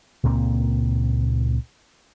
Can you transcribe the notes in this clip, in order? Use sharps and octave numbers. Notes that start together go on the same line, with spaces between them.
C#2 A#2 A#3 C4